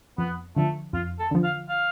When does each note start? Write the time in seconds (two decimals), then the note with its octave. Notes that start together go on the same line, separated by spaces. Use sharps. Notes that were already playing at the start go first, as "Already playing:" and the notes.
0.18 F2 B3
0.56 D3 F3 A3
0.93 F2 F4
1.19 A4
1.31 D3 F3
1.44 F5
1.69 F5